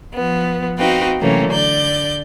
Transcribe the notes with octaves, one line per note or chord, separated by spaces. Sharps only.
F3 B3
C4 D#4 F#4 B4 F5 G5
C3 E3 F#3 A3 A#3 C#4
D3 D5 G6